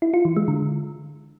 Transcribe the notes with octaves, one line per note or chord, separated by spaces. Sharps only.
E4
F4
E3
G#3
D3